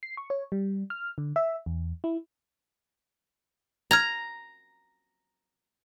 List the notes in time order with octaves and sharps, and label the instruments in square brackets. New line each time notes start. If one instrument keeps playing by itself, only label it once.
[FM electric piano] C7
C#6
C#5
G3
F6
D3
E5
E2
E4
[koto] A#5 [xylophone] F6 G#6 F7